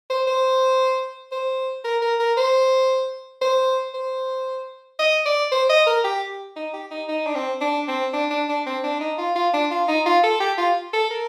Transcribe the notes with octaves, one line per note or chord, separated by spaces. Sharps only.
C5
C5
C5
A#4
A#4
A#4
C5
C5
C5
D#5
D5
C5
D#5
A#4
G4
D#4
G4
D#4
D#4
D4
C4
D4
C4
D4
D4
D4
C4
D4
D#4
F4
F4
D4
F4
D#4
F4
A4
G4
F4
A4
A#4